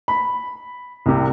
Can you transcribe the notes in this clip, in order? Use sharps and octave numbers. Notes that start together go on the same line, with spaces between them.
B5
C2 C3